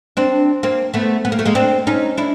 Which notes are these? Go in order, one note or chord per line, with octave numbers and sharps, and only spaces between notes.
C4 D4
A#3 C4
A3 B3
B3
A#3
A3
G#3 A#3
C4 D4
C#4 D#4
D4 E4